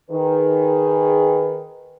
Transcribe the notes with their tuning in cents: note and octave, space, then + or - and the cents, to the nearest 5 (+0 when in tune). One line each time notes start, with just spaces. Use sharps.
D#3 +0 G#4 +0 B4 +10